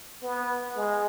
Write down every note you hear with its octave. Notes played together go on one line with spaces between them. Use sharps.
B3
G#3